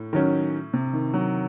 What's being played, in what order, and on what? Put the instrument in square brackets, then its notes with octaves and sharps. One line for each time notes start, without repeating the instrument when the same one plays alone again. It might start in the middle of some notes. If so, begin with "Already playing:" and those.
Already playing: [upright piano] A2
[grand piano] D#3 F#3 C#4
[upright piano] C3
D#3
F#3